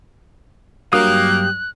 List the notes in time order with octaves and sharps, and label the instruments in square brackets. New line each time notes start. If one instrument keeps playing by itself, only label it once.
[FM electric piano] G2 F#3 [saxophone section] A#3 [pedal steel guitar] G4 D#6 [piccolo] F#6